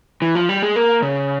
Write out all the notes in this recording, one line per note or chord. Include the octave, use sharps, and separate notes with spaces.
E3
F3
G3
G#3
A#3
C#3